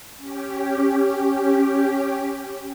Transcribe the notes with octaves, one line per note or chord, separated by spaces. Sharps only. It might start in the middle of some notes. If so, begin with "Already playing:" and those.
C#4 G4